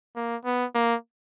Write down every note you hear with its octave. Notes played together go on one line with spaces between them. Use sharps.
A#3
B3
A#3